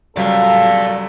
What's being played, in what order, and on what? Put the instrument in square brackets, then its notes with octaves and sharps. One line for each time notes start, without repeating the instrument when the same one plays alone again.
[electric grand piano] C#2 F#3 G3 [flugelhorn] A4 [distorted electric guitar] D5 F5